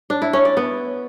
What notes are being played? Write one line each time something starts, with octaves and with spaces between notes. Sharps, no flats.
D4
E4
C#4
D5
B3